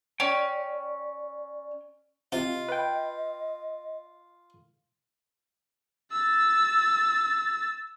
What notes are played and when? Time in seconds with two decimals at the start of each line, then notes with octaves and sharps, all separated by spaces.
0.20 C#4 D5 G5
2.32 C3 F4 D#5
2.68 B4 G5
6.12 E6 A6